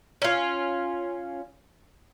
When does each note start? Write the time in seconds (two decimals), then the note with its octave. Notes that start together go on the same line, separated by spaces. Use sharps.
0.22 C#4 F4